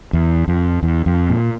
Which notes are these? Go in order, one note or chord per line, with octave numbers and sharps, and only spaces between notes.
E2
F2
E2
F2
A#2